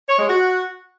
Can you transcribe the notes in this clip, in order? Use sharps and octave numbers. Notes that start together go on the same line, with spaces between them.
C#5
G#3
F#4